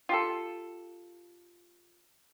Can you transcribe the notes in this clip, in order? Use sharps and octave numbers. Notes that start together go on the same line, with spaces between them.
F4 G4 A4